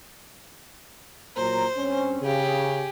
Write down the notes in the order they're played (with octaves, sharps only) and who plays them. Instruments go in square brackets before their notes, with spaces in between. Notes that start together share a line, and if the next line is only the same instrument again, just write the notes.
[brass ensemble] A#2 F#3 A#5 [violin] C5
[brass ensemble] G2 C4 C#4
[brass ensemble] C#3 [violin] G4 G#4